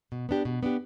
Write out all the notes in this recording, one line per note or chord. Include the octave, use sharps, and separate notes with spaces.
B2
B3 D4 G4
B2
B3 D4 G4